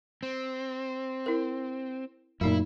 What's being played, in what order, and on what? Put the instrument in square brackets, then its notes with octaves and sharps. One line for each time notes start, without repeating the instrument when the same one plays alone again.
[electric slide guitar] C4
[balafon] E4 A#4
[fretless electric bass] F#2 A#2 [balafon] A3 D#4 [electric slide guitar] E4